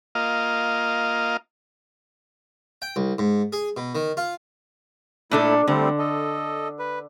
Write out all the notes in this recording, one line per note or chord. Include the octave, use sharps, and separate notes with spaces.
A#3 F4 D#5 F5
G5
C2
G#2
G#4
B2
D#3
F4
A#2 A3 D4 E4 A4
D3 G3 A3 C4
A4 D#5
B4